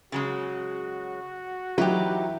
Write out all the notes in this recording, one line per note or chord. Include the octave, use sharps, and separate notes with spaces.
C#3 F#3 G#3 F#4
E3 F#3 D#4 G4 B4